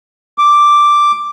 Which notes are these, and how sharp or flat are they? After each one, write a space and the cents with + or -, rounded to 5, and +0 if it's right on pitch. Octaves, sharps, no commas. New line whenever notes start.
D6 +0